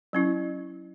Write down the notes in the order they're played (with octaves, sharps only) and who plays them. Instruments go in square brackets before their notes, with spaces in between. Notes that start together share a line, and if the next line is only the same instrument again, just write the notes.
[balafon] F#3 C#4 E4